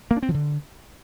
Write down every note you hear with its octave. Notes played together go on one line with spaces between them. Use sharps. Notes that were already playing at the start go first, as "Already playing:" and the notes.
A#3
D4
C4
F3
D3